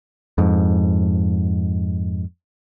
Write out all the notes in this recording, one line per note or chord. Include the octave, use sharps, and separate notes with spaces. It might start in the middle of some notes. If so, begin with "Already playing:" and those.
F2 G#2